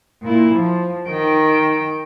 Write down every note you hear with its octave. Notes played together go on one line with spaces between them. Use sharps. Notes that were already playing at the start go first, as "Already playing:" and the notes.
A#2 E4
F3
D#3 G5